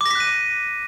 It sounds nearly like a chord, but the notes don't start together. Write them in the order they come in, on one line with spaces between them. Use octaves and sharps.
D6 A#6 B6 F#6 D#7